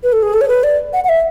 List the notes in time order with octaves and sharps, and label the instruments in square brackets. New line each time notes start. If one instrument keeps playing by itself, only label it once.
[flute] B4
A4
G#4
A4
C#5
B4
D5
F#5
F#5
E5